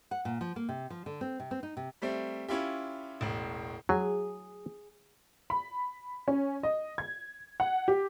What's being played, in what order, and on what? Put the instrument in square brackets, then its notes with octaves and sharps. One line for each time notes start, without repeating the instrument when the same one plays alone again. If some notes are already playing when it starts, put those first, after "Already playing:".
[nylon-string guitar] F#5
A#2
F3
A#3
C3
F3
D3
C4
C3
C4
D#4
C3
[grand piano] G3 A3 C4
C#4 E4 F4 G4
E1 A1
[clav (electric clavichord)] F#3 [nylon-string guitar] G#4
[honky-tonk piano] B5
C#4
D#5
G#6
F#5
G4